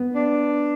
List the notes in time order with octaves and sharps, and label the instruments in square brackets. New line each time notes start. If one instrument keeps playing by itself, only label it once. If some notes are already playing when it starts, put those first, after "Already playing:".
Already playing: [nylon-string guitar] B3
[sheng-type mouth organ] D4